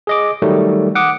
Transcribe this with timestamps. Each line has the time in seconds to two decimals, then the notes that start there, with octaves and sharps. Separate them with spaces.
0.07 G#4 D#5 D6
0.42 D#3 F#3 G3 A3
0.95 F#5 D6 D#6